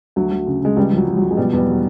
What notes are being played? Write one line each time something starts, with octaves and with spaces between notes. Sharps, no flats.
D2 F#3
F#3
C#3
C#3 G#3
C#2 G3
F3 F#3
F3
F#3
F3
G#3
B2 G3
E2 G3
F#3